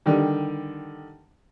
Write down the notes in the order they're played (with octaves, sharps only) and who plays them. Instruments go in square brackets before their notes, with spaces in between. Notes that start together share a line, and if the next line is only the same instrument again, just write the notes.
[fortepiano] D3 D#3 G3